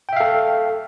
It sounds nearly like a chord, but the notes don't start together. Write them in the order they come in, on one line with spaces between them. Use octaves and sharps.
G5 E5 F5 A4